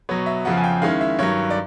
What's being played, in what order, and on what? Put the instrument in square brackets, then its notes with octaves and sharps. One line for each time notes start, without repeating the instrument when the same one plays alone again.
[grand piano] B2 F#3 B3 C#5
E5
F2 C#3 F3 F#5
G#5
G5
D#3 G#3 C#4 E4 F5
E5
G2 D#3 F#3 C#5
D5